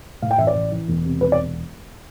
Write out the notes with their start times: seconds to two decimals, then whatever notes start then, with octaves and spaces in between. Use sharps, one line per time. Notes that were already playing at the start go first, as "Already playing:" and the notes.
0.22 A2 F5
0.31 G5
0.38 A1 E5
0.47 D5
0.55 A1
0.72 E3
0.88 E1
1.05 C3
1.21 E1 B4
1.32 D5